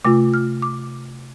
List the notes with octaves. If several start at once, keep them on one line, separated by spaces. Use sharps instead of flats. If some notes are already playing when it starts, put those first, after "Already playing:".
C3 A3 F4 D6
F6
D6